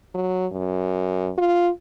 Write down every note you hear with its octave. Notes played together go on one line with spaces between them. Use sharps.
F#3
F#2
F4